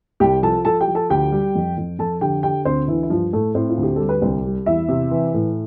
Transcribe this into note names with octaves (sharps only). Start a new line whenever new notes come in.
C2 G4 G5
F3 A4 A5
F3 A4 A5
G4 G5
F3
A4 A5
D2 G4 G5
G3
F2
F2
F2 A4 A5
D3 G4 G5
D3 G4 G5
D2 C4 C5
D3 E3 E4
E4
G2 F3 F4
A2 A3 A4
A2 C4 C5
F4
D2
G4
G3 A4
B4
C2 C4 C5
G3
E2 E4 E5
C3
E3
A2